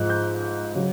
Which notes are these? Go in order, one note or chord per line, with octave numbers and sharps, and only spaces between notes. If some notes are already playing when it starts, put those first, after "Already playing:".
Already playing: G#2 F3 F#6
G6
C#3 F#3